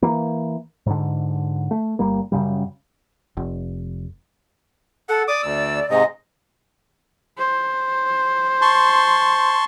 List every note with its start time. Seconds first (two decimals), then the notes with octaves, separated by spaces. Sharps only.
0.02 E3 A#3
0.86 G#2 D3
1.71 A3
1.99 G1 G3 A#3
2.32 F#2 C#3 G3
3.37 F1
5.09 A4 F#5
5.28 D5 D6 D#6
5.43 D2 E6
5.90 G#2 C3 D#5
7.38 C5
8.62 A5 C6 C#6